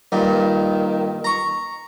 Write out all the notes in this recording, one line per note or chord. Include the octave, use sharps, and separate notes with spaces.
G2 A#2 D#3
A#5 C#6